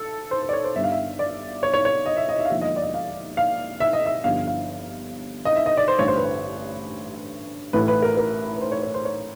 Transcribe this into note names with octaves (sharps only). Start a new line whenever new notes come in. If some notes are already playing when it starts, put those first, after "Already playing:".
Already playing: A4
C5
C5
D5
C#5
C5
G1 G2 D#3 E5
F5
E5
D5
C#5
C#5
C#5
D#5
E5
D#5
E5
F5
E1 D#2 D3 F3 E5
D#5
D5
D#5
F5
F5
E5
D#5
E5
G1 G2 D3 F3 F5
F5
D#5
E5
D#5
D5
C5
A1 G2 D3 C#5
C5
B4
C5
A1 A2 E3 B4
B4
A#4
A#4
B4
C5
C#5
C#5
C5
C#5